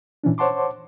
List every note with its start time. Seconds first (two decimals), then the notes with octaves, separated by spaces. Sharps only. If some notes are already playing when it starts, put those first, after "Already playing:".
0.24 A#2 E3 C#4 D4
0.38 C5 C#5 F#5 A5 C6 D6